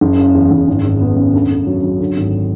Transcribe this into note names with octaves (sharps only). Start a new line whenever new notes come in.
F#1
C#3
E2
F#1
G#1
G#1
B3
F#2
D2
D2
F#3
F#3
D3
G#1